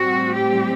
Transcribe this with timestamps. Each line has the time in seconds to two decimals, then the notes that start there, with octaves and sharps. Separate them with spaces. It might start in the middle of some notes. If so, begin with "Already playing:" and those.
Already playing: A2 G3 C4 F#4
0.34 G4